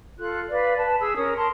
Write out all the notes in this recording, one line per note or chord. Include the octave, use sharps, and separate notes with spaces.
F4 A4 F#6
B4 D5 F5
B4 A5
G#4 E6
C#4 A#4 D#6
A#4 A5 C6